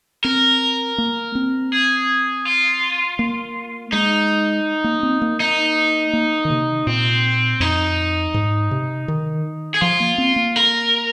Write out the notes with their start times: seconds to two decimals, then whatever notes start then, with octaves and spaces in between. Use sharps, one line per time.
0.24 C4 A#4
0.98 A#3
1.35 C4
1.72 G#4
2.45 F4
3.19 A#3
3.92 G#3 D#4
4.84 A#3
5.03 C4
5.22 A#3
5.40 D#4
6.13 A#3
6.45 D#3
6.50 C3
6.87 A#2 C4
7.60 F2 D#4
8.34 G#2
8.71 C3
9.08 D#3
9.74 G#4
9.81 F3 F4
10.00 A#3
10.18 C4
10.36 A#3
10.56 A#4